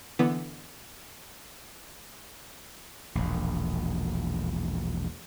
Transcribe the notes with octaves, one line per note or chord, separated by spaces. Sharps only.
D3 E3 B3
E1 A#1